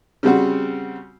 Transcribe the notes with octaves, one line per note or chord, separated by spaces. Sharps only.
C#3 G3 C4 F#4